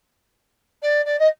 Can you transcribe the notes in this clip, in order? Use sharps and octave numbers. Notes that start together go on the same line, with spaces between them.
D5
D5
D#5